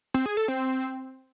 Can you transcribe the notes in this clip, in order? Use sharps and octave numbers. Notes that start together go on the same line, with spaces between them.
C4
G#4
A4
C4